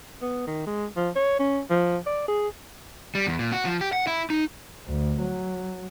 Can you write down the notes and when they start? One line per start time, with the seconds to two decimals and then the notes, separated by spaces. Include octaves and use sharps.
0.22 B3
0.47 D#3
0.67 G#3
0.96 F3
1.16 C#5
1.39 C#4
1.70 F3
2.06 D5
2.28 G#4
3.15 G3
3.27 E2
3.39 A#2
3.52 F#4
3.65 F3
3.81 G4
3.93 F#5
4.07 E4
4.30 D#4
4.87 D2
5.21 F#3